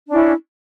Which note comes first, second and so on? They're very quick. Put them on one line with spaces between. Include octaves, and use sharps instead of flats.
D4 C#4 E4